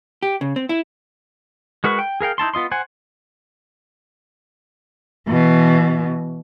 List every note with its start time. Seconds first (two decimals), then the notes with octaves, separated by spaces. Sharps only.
0.23 G4
0.41 C#3
0.56 C4
0.69 E4
1.84 G#3 F#4 A#4 B4 C#6
1.99 G5
2.21 G#4 A#4 F5 G5
2.38 D#4 E4 A5 C6
2.54 B3 F4 D#5 C6
2.72 C5 F#5 G#5
5.28 B2 E3